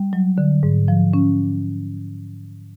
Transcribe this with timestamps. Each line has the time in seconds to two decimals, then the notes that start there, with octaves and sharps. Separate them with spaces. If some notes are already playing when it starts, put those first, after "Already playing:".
Already playing: G3
0.13 F#3
0.38 D3
0.63 G#2
0.88 F3
1.14 C#4